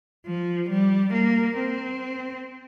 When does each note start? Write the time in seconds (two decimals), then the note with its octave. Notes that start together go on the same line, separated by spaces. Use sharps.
0.26 F3
0.69 G3
1.14 A#3
1.57 C4